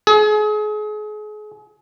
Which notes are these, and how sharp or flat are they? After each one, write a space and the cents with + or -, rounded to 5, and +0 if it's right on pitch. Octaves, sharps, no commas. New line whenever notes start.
G#4 +35